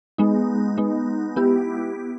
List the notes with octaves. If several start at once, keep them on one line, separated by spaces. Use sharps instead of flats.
G#3 B3 D#4
G#3 B3 D#4
B3 E4 G4